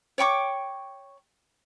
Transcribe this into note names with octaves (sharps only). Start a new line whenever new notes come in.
C#5 G5 C#6 D6